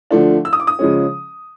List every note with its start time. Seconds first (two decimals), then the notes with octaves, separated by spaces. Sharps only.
0.11 D3 F3 A3 D4
0.45 E6
0.53 D#6
0.60 D6
0.67 D#6
0.79 C#3 F3 G#3 C#4